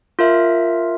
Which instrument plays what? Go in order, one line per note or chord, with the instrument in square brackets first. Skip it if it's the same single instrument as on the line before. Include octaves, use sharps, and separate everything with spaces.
[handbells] F4 A#4 E5